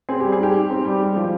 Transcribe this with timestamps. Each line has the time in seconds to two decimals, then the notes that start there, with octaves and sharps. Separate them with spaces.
0.09 C4 G#4
0.20 G4
0.24 G3
0.32 G#4
0.39 G#2 G4
0.55 G#2
0.71 C4
0.85 G3
1.01 G#3
1.16 F3